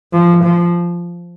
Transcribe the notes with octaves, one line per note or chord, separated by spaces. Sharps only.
F3
F3